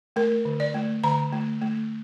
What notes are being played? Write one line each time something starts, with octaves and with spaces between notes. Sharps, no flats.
A3 A#4
D3
D5
A3
D3 A#5
A3
A3